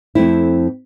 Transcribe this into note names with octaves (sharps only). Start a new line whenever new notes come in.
F2 A3 C4 E4